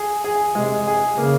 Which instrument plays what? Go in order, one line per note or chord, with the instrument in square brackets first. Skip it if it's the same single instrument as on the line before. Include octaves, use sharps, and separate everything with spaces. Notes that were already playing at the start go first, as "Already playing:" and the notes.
Already playing: [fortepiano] G#4
G#4
[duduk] C3 [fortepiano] G#3
[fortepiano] G#4
[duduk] C#3 [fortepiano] A#3